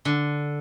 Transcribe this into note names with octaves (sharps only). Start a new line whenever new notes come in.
D3